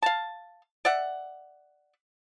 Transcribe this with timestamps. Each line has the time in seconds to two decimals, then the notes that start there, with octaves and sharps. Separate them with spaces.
0.02 F5 A5
0.85 D5 E5 F#5